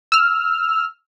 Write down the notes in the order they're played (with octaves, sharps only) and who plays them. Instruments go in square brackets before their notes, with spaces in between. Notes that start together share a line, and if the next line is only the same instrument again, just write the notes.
[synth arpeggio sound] E6 F6